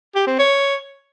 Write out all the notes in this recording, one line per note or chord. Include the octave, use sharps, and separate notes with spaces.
G4
C4
C#5